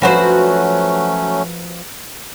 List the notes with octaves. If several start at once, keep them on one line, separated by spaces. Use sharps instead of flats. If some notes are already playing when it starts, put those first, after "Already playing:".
F3 F#3 A3 C#4 F#4 B4 C5